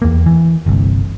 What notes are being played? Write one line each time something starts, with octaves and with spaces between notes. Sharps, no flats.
E2 A#3
E3
G1 C2